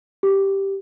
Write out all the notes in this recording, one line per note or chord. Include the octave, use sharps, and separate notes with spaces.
G4